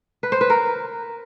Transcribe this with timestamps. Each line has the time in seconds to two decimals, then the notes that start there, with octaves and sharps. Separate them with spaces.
0.23 B4
0.32 C5
0.41 B4
0.50 A#4